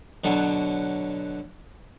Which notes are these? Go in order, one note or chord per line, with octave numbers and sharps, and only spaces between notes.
B2 D3 F#3